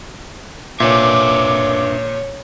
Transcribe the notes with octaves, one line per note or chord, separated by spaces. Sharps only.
A#2 D4 B4 C#5 E5 D6